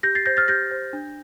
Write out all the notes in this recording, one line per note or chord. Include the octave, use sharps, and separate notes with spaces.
G4 G6 A#6
A6 C7
C5 G6 A#6
F6 A6
G4 G6 A#6
C5
D4